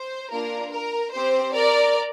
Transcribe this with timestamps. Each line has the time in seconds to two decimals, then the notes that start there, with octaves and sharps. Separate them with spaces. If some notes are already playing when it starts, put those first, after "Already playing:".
Already playing: C5
0.32 A#3 D4 F4 A#4
0.72 A#4
1.12 C4 G4 C5
1.53 A#4 D5